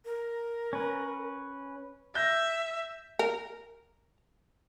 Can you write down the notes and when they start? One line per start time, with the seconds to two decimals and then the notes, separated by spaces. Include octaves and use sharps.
0.05 A#4
0.73 C#4 B4
2.15 E5 G6 A#6
3.19 A#4